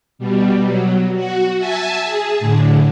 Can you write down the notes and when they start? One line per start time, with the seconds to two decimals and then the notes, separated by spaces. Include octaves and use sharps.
0.19 B2 G3
0.63 F#3
1.15 F#4
1.57 E5 G#5 A5
2.04 G#4
2.40 A2 D3